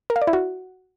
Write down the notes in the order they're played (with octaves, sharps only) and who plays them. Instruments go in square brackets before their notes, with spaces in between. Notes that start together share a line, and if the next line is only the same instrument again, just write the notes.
[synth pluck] A#4
F5
D5
E4
F#4